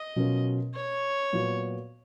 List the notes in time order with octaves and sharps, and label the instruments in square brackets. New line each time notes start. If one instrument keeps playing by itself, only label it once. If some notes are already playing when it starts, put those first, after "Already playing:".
Already playing: [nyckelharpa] D#5
[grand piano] B2 F#3 C#4 F4 A#4
[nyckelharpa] C#5
[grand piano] A#2 F#3 B3 F#4